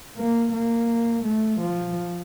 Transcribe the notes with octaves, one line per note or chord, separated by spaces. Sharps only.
A#3
A#3
A3
F3